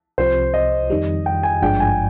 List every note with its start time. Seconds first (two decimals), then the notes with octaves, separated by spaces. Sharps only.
0.18 C2 C3 F3 C4 C5
0.54 D#5
0.90 F2 D#3 G3
1.26 G5
1.43 G#5
1.62 G#1 G2 F3 G#3 D4 G5
1.80 G#5